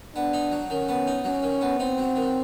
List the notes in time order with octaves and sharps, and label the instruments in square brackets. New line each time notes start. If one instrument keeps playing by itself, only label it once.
[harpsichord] B3 [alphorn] D4
[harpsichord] D#4
F#3
[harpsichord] D#3 [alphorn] C#4
[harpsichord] B3
D#4
[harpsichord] F#3 [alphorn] C#4
[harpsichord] D#3
B3
[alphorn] C4 [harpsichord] D#4
[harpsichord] F#3
D#3